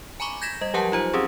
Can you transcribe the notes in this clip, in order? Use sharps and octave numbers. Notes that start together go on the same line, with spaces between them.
G#5 A#5 B5 C#6 D6
G6 G#6 A#6 B6 E7
G3 D#5
F3 F#3 G4 A#4 F#5 A5
D#4 F4 C5
C4 C#4 G4 G#4